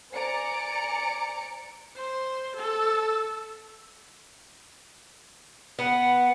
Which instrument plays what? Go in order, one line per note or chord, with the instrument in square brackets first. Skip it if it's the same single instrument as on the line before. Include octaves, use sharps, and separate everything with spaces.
[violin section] C5 D5 G#5 A#5 C#7 D7
[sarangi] C5
A4
[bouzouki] B3 [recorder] F#5